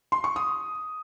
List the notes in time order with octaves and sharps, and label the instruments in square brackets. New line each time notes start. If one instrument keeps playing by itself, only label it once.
[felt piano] C6
C#6
D#6